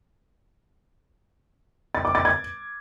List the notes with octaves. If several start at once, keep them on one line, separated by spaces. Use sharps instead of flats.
A6
D6
A6
G#6